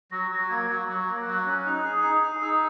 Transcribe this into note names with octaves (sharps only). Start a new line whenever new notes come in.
F#3 A#6
F#3
A#3 G#6
F#3
F#3 F#6
A#3
F#3
C#4
D#4
G#4
D#4
G#4
D#4 E6